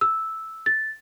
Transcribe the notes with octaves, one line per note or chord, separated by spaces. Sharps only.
E6
A6